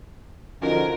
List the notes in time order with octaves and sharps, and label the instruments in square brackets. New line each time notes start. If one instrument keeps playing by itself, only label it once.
[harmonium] D3 F3 D#4 [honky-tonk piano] C#4 F4 F#4 [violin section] A#4